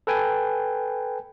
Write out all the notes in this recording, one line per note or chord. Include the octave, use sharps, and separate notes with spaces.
A4 B4 G5 G#5